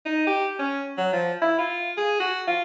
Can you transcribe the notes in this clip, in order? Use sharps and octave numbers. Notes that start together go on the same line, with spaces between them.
D#4
G4
C#4
F#3
F3
E4
F4
G#4
F#4
F4